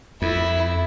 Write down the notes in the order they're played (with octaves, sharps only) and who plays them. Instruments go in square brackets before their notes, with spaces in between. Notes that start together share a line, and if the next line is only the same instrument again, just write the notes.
[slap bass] F2 [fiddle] E4